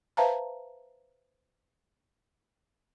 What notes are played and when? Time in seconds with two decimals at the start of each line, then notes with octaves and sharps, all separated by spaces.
0.17 B4 C5 E5 F5 A5 A#5